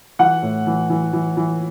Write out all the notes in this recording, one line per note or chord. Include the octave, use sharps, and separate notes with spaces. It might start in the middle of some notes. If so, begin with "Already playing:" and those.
E3 F#5
A2
E3
E3
E3
E3